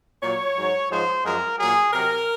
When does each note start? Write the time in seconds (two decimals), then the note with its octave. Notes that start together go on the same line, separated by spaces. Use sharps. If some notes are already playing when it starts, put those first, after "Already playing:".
0.22 A#2 F#3 C#5
0.57 G#2 F#3
0.91 G#2 F3 G#3 C5
1.25 F#2 F3 G#3 A#4
1.59 A#2 F#3 G#4
1.93 C3 F#3 A#4